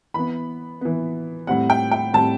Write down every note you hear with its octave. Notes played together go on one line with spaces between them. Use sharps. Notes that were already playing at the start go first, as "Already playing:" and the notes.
E3 B3 B5
E3 B3
A2 G3 C4 F#5
G5
G5
A2 G3 C4 A5